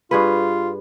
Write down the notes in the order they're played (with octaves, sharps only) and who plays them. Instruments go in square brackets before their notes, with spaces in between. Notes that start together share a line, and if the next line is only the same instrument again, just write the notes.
[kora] G2 G#4 B4 [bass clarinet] F4